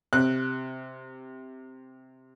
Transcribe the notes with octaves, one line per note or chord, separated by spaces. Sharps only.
C3 F#6